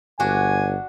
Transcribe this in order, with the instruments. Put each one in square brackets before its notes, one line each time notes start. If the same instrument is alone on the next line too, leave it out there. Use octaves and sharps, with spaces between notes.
[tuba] G1 [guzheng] D4 F#4 [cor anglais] G#5